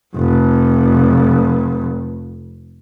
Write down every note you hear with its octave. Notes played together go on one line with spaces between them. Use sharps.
F1 F2